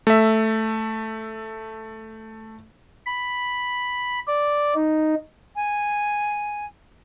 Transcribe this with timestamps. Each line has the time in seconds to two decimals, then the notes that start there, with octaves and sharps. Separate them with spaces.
0.07 A3 E5
3.06 B5
4.27 D5
4.75 D#4
5.56 G#5